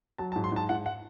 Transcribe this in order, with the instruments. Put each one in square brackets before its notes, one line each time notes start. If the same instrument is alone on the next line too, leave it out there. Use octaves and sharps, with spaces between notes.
[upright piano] F#3 [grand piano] A5
[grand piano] A5
[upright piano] G#2
[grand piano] C6
[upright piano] G#2 [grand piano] A5
[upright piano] G#2 [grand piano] F#5
[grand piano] F#5